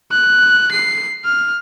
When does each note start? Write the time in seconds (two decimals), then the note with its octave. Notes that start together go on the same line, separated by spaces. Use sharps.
0.12 F#6
0.72 C7
1.25 F6